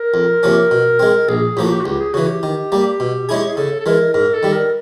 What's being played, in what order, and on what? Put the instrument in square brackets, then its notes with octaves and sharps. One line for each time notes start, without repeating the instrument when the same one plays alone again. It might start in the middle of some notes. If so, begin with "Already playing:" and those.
Already playing: [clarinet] A#4
[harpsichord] F2
C3 F3 A#3 C#4
B2
G#3 C4
[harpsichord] A#1 [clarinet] G#4
[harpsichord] A2 F3 A#3 [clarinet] G4
[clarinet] F#4
G4
F#4
[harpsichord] C#2 [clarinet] G4
[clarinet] G#4
[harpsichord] C#3 E3 [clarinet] F#4
[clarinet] G4
[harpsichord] D#3
G3 A#3
B2
G#3 C#4 E4 G#4
[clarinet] G#4
[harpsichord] C#3 [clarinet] A4
[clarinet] A4
[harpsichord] E3 G#3 [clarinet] A#4
[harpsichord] G#2 [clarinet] A#4
[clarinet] A4
[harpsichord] D#3 G3
[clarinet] A#4